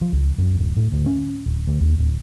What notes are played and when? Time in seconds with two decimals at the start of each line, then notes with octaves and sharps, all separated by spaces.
0.01 F3
0.13 C#2
0.38 F#2
0.58 D1
0.77 A2
0.92 D2
1.06 C#4
1.46 D1
1.67 D2
1.81 D#2
1.98 D1